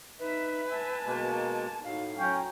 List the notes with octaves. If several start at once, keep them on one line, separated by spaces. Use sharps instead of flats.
D#4 B4 E5
E5 G#5 A5
B2 G#3 A#3
A2 D#4 F#4 F5
F#3 C#4 G5 A#5